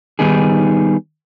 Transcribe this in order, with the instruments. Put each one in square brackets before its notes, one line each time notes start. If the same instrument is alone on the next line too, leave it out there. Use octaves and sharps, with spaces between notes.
[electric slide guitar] D#3 G3 B3 D#4 G#4